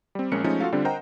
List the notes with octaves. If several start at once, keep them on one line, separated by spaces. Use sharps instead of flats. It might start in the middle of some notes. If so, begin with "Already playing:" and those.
G3 C4
A#1 G#3 C#4 A#4 C#7
F3 G#3 A3 C#4 D#4
F4 F#4 A4 F5
D3 G3 C4 D4 F4
A#4 C5 D#5 F#5 G5 A#5